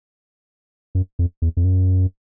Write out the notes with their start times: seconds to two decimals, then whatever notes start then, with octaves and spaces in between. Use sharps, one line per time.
0.95 F#2
1.19 F2
1.42 E2
1.57 F2
1.65 F#2